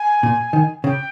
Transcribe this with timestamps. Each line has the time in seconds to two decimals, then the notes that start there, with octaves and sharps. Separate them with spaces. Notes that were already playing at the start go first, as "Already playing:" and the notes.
Already playing: G#5
0.23 A#2
0.53 D#3
0.84 C#3 G5